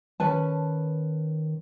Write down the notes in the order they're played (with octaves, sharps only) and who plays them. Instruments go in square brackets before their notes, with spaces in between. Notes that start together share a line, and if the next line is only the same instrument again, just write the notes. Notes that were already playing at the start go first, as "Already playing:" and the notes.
[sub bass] D#3 [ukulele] C#4 B4 A5